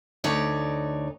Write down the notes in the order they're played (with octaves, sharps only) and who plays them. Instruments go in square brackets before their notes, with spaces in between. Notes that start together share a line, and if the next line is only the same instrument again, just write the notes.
[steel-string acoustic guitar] D2 D#4 C#5 D5